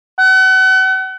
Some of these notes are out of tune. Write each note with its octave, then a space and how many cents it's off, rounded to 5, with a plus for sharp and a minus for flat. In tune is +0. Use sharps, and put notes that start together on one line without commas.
F#5 +35